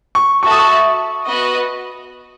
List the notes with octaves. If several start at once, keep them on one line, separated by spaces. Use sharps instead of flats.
C#6
F#4 A4 E5 A5 C#6
D#6
C#6
B3 F#4 B4 D#5